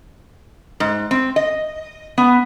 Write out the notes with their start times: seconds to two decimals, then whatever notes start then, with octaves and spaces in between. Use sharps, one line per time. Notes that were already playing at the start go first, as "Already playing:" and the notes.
0.80 G#2
1.11 C4
1.36 D#5
2.18 B3